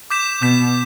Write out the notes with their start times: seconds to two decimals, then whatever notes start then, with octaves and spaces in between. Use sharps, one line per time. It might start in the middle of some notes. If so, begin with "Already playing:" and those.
0.10 D6 G6 B6 E7
0.41 B2 D6 G6 B6 E7